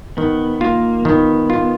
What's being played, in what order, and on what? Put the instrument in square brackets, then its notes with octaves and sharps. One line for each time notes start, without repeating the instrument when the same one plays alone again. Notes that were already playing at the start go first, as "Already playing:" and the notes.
[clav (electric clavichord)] D#3 [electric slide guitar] B3
[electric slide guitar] A#3 [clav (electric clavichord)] F4
[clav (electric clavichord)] D#3 [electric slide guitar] B3
[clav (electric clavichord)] F4